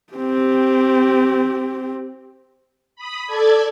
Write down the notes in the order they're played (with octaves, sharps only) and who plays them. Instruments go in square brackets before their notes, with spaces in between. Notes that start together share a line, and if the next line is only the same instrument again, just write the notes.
[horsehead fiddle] C4 G4
[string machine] B5 D#6
A4 D5 G#6